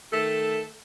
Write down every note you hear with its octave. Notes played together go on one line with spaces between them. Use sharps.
D#3 A3 A4